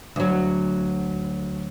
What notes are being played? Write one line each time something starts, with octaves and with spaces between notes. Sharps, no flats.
D2 F#3